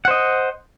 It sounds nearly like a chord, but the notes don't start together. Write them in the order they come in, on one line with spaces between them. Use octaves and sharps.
F#5 C5 D#5